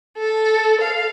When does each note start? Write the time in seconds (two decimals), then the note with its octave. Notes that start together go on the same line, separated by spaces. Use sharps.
0.17 A4
0.81 F5